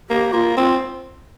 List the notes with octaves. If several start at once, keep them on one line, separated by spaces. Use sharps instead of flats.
A#3 G4
A#3 F4
C4 F4